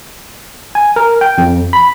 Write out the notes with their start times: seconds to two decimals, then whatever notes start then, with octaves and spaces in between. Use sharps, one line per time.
0.75 G#5
0.96 A#4
1.21 G5
1.38 F2
1.73 B5